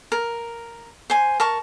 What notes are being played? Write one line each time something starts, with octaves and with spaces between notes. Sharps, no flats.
A#4
C5 G#5
A#4 A5 C#6